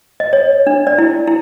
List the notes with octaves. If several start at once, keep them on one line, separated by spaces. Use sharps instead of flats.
D#5
C#5
D4
D5
E4
E4